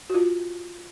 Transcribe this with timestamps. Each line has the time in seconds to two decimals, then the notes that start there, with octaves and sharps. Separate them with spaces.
0.10 F#4
0.14 F4